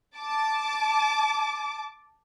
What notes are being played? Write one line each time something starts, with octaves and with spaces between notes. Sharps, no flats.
A5 D6